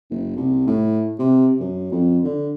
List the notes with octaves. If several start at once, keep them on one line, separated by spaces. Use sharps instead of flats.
F#1
C2
A2
C3
F#2
F2
D3